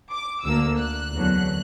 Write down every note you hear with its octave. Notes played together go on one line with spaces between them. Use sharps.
D6
D2 D3 A#3 E6
F#6
E2 D3 F#3